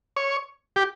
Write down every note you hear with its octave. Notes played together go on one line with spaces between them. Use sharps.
C#5
G4